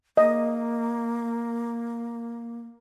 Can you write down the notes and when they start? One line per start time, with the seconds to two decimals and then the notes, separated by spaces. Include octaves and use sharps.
0.17 A#3 D#5